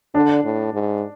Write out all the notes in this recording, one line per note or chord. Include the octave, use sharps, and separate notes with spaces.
D3 D4
A2
G#2